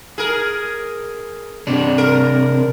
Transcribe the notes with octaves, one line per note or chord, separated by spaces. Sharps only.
G#4 A#4
C3 D4
A#4